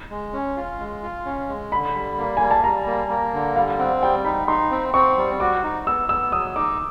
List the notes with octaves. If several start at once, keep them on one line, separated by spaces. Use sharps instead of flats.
G#3
C#4
F4
G#3
F4
C#4
G#3
D3 B5
G3
A#3
G3 G#5
A5
G3 A#5
A#3
A#3
D3
G3 F5
C4 F#5
G3 G5
D#4 B5
D#4 C6
C4
C4 C#6
G3
F#4 D6
D#4
B3 E6
B3 E6
F#3 D#6
D#4 D6